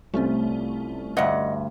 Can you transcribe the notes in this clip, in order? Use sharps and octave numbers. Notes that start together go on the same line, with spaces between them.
C2 C3 A3 C#4 F4
D2 G2 D#5 F#5